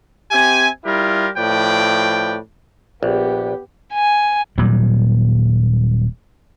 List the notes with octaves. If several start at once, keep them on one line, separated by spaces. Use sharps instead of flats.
C4 G4 E5 G#5
G3 E4 F4 G4 A#4
A2 F3 B4 D5 G5
A#1 B3 G4
G#5
D#1 A#2 F#3 G3